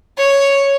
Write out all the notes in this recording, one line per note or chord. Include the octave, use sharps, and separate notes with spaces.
C#5